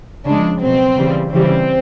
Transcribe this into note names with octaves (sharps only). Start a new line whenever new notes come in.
C#3 F3 G#3 D4
B2 F#3 C4
C#3 E3 G3
C#3 E3 G3 C4